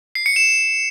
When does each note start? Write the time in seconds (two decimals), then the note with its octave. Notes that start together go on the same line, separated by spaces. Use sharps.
0.15 C7
0.26 C#7
0.36 E7